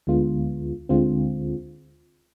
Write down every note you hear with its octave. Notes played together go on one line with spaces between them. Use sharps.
D2 D3 G#3 B3 F4
D2 D3 G#3 C4 F4